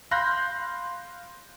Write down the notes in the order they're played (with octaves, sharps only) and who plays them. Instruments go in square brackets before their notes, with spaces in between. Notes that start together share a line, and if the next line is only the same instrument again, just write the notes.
[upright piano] F5 B5 C6 F#6 G6 A#6